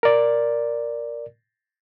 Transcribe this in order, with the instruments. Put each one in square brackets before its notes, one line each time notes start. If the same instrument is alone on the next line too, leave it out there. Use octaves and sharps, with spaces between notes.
[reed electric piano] A#4 D5